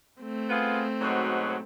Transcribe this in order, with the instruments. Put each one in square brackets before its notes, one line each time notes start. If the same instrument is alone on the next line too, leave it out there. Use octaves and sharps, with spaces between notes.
[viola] A3 C4
[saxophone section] B3 F4 G#4
G#2 B2 F#3